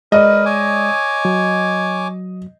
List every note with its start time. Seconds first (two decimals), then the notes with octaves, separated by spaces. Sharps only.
0.12 G#3 A#4 B4 D5 D#5
0.46 C#5 G#5 D6
1.25 F#3